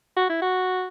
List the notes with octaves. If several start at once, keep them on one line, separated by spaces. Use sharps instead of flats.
F#4
E4
F#4